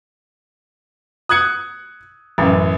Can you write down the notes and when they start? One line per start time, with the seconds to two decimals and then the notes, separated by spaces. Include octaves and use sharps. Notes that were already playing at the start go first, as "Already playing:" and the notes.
1.29 D#6 F#6 G#6 C#7
2.38 A1 F#2